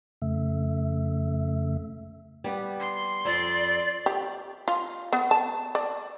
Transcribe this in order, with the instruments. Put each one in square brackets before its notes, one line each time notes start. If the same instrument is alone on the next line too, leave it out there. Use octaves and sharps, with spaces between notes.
[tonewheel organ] F2 C#3 A3 E5
[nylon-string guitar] G3 B3 G4
[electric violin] C6
[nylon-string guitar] F2 [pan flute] D5
[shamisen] G4
F4
B3
A5
D5